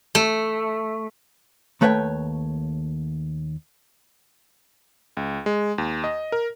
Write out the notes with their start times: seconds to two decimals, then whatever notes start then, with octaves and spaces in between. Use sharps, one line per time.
0.15 A3
1.81 D#2 A3 B4 C#5 D#5 G5
5.17 C#2
5.46 G#3
5.78 D#2
6.04 D#5
6.32 A#4